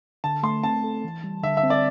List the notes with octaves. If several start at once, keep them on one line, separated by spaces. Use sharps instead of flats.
D3 A5
A3 C6
C4 A5
A4
E3
G3
D3 E5
E5
C4
D5